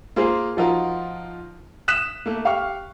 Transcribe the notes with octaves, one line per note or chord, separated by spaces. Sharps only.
A#3 F4 G#4 A#4 C5
F3 D#4 F4 F#4 A#4
D#6 F#6 B6 E7
A3 A#3
G4 F5 G5 C#6 F6